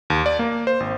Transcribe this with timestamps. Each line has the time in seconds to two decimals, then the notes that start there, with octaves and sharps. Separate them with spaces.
0.10 D#2
0.26 D5
0.39 A#3
0.67 C5
0.80 G#1